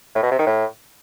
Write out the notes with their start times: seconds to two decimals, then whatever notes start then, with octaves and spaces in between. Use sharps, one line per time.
0.15 A2
0.23 B2
0.31 C3
0.39 D#3
0.47 A2